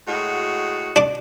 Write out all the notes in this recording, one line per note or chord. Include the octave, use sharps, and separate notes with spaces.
A2 G#3 F#4
D4 D6